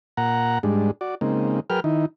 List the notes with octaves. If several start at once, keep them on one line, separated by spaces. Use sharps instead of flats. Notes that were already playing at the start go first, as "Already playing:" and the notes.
A#2 F#5 A#5
G#2 G3 G#3 D4
F#4 D5
C#3 G#3 A#3 C4 D#4
F#3 G#4 A#4 B4 G5 F6
D#3 D#4 E4